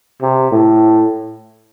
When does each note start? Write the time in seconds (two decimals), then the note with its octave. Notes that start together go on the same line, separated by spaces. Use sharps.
0.22 C3
0.51 A2